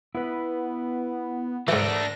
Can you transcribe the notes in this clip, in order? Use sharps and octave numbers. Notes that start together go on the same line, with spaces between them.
B3 E4 B4
G#2 E3 A3 D4 A#4 A#6